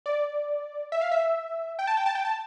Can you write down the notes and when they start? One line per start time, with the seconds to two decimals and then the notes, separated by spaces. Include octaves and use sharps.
0.06 D5
0.92 E5
1.01 F5
1.11 E5
1.79 G5
1.87 A5
1.97 G5
2.06 A5
2.15 G5
2.25 A5